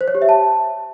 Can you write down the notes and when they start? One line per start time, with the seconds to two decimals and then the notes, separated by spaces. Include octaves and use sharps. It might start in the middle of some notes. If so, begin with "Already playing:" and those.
0.01 C5
0.08 C#5
0.15 G4
0.22 E5
0.29 A5